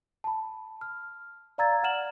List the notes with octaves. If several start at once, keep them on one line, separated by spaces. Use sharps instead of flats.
A5 B5
F6
D5 F5 A#5 E6 G#6 A6
F#5 F6 E7 F#7